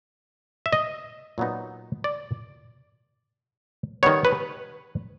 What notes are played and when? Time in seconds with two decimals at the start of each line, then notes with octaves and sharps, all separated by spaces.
0.66 E5
0.73 D#5
1.38 A#2 F#3 B3 D#4
2.04 D5
4.03 D#3 G3 B3 C#5
4.25 B4